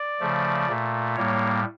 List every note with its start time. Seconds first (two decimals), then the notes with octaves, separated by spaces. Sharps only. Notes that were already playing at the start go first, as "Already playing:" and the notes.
Already playing: D5
0.20 C#3 F3 A3
0.68 A#2 A3
1.16 A2 G3 A#3 C#5